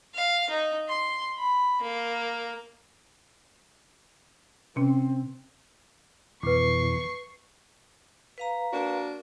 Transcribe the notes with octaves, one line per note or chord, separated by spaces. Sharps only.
F5
D#4
C6
B5
A#3
C3 C4 C#4
F2 B2 E3 B4 C#6 D6 C7
B4 F5 A#5
A#3 D4 F#4